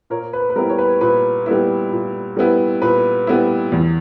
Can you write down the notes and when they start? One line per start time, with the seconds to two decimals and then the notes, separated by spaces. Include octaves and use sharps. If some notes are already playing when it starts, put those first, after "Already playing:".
0.10 A#2 A#4 C#5
0.33 B4
0.50 B4
0.56 G3 B3 E4 A#4
0.70 C#5
0.78 B4
1.01 A#2 B4
1.46 G3 B3 E4
1.92 A#2
2.37 G3 B3 E4
2.82 A#2 B4
3.27 G3 B3 E4
3.72 E2